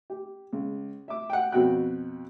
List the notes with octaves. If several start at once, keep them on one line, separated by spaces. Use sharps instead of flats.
G4
C#2
E5 D6
F#5 G5
F2 B2 F#4 G5 F#6